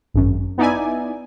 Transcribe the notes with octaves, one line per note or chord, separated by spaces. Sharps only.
G#1 F#2
B3 D#4 E4 D5 E5 G#5